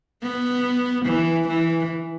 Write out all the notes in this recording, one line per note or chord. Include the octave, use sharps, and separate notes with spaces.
B3
E3
E3